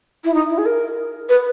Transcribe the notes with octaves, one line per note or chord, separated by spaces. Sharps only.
E4
D#4
E4
G#4
A#4
B4